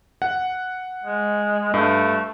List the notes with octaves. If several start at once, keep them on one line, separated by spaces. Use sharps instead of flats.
F#5
G#3
G2 A3